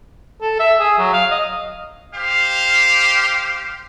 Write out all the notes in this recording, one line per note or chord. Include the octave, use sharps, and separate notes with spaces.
A4
E5
G#4
F#3
F5
D#5
G4 C5 F5